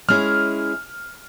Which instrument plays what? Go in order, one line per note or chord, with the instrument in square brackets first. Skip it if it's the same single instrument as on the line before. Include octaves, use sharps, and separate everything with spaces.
[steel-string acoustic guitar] G#3 C#4 E4 G#4 [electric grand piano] F6